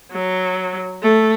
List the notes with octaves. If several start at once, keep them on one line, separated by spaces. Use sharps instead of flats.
F#3
A3